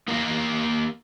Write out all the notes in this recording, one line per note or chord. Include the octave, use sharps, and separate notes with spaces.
A#3 G4 A#4 D#5 F5